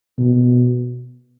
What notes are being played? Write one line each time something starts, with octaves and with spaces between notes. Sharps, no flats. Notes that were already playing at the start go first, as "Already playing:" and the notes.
B2